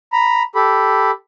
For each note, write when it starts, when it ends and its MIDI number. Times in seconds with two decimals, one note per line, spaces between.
0.13 0.43 82
0.13 0.43 83
0.55 1.11 67
0.55 1.11 69
0.55 1.11 83